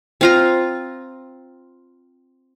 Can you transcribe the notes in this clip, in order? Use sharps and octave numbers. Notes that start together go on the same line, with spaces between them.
C4 F4 A#5